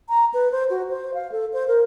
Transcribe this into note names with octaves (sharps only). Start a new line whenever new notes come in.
A#5
B4
C5
F#4
C5
F5
A4
C5
A#4